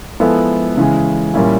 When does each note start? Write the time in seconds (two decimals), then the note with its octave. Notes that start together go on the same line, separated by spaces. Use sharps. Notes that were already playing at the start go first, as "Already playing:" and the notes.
0.20 F3 G#3 B3 E4 A4
0.77 C#3 E3 G#3
1.34 A#2 G3 A#3 C#4 E4